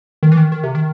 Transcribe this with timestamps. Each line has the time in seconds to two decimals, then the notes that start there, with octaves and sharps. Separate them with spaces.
0.23 D#3
0.32 E3
0.37 D#3
0.52 D#3
0.63 C3
0.75 D#3